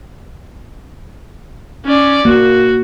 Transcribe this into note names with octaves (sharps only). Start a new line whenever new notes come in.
C#4 D5
A#3 F#4